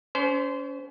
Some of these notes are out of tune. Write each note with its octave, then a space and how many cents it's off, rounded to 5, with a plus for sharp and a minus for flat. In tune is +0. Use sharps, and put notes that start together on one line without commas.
C#4 +35 C5 -20